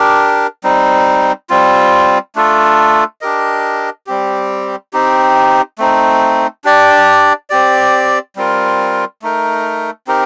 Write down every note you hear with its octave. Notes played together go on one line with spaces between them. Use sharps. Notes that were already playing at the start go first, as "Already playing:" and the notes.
Already playing: D4 G4 A#4
G3 C4 D#4
G3 C4 F4
A3 D4 F4 A4
D4 G4 A#4 D#5
G3 C4 G4
C4 D#4 G4
A3 C4 D#4
D4 G4 D5
C4 G4 D5
G3 C4 F4 A#4
A3 D#4 A#4
C4 D#4 G4 A#4